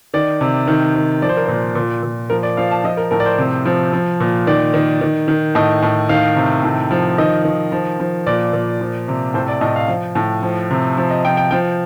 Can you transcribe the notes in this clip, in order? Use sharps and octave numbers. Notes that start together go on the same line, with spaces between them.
D#3 D5
C3
D#3
D#3
F3 D5
C5
A#4
A#2 C5
A#2
A#2
F3 A#4
D5
F3 F5
A5
F3 D#5
A#4
A2 A#4
D5
C5
C3
F3
F3
A#2
D#3 D5
D#3
D#3
D#3
A2 D#5
A2
D#3 F5
C3
A2
F3
D#3 D#5
D#3
F3
F3
A#2 D5
A#2
F3
C3
A2 C5
D5
A2 D#5
F5
F3
A2
F3
C3
F3
D#5
F3 G5
G5
F3 G5